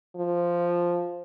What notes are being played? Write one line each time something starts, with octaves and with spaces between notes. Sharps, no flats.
F3